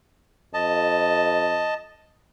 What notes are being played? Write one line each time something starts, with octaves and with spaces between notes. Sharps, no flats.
F2 D#5 A5